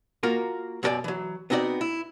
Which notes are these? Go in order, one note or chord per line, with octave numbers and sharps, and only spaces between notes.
A#3 F4 F#4 A#4
F#2 B2 D#4 A4 D5 G#5
E3 F#3
B3 C4 D#4 F#4 D5
E4